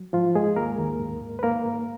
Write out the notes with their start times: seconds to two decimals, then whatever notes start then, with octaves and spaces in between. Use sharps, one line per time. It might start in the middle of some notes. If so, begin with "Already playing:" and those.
Already playing: F#3
0.13 G#2 F3 F4
0.35 G#2 G#3 G#4
0.56 D#2 A#3 A#4
0.78 D#2
1.00 G#2
1.21 G#2
1.39 B4
1.43 G#2 A#3 A#4
1.65 G#2